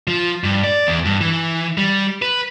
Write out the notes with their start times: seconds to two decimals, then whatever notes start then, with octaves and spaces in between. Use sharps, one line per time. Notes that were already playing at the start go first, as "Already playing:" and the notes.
0.07 F3
0.44 G2
0.64 D5
0.87 E2
1.05 G2
1.21 E3
1.78 G3
2.22 B4